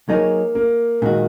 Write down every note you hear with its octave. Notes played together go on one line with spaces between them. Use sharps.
F#3 A#3 D#4 G#4 C#5
A#3
A#2 D#3 G#3 F#4